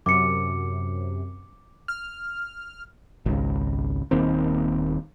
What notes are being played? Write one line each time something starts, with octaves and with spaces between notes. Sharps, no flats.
F#2 C3 D6 C#7
F6
G#1 C#2
D#1 D#3 A#3 C4